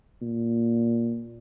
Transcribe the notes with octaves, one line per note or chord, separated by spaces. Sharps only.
A#2